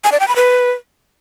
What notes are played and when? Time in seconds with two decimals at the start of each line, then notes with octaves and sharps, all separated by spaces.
0.04 G#5
0.12 D5
0.20 G5
0.28 B5
0.36 B4